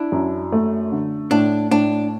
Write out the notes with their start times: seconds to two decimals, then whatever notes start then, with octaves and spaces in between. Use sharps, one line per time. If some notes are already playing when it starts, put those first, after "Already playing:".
Already playing: D4 E4
0.12 F#2
0.52 A3
0.92 D3
1.31 A2 D4
1.71 A2 D4